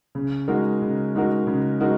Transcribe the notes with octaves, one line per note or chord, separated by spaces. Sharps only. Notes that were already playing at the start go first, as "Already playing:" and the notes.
C#3
G#3 D#4 F#4 A#4
C#3
G#3 D#4 F#4 A#4
C#3
G#3 D#4 F#4 A#4